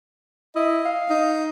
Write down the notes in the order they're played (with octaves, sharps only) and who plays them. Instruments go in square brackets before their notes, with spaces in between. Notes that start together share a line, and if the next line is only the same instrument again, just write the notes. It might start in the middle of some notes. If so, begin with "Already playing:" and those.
[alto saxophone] E4 [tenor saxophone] D#5
[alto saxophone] F5
[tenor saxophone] D#4